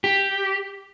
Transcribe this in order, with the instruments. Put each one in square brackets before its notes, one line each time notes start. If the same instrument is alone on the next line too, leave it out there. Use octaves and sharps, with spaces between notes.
[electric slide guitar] G4